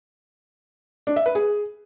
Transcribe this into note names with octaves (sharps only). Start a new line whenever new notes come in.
D4
E5
B4
G#4